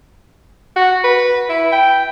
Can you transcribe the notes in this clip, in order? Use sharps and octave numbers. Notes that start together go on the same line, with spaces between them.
F#4
B4
E4
G5